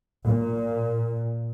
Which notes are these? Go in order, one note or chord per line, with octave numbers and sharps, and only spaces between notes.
A#2